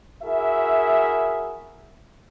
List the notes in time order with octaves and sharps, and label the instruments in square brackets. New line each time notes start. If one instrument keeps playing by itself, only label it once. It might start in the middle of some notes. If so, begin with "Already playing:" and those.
[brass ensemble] E4 F#4 G#4 A#4 E5